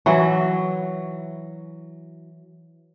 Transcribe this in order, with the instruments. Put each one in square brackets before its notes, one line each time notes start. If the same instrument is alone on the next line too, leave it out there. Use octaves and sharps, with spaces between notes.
[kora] E3 F#3 E4